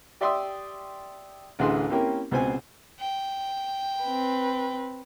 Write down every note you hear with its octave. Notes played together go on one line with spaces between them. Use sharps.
G4 D5 E5 G5 C6 D#6
A1 D2 E3 D4 G#4 C6
A#3 C4 C#4 E4 G4 A#4
C#2 B2 C4 C5 G#5
G5
C4 B4